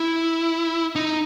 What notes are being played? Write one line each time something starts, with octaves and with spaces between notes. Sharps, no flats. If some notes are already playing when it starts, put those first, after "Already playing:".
Already playing: E4
D#4